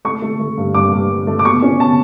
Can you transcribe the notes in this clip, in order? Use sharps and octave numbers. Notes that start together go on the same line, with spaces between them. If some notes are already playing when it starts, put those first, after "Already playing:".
A3 C#6
A3
A3
G2
G2 D6
G2
G2
A3
D6
B2 C#6
C#4
B2 A5